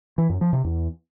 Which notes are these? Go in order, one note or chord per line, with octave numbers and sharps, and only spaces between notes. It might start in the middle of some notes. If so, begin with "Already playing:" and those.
E3
F#2
F3
C3
E2